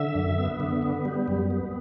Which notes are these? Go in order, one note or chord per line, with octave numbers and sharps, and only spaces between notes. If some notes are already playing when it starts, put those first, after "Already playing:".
Already playing: D3 E5
F#2
B3
D3
B3
G3
F#2
B3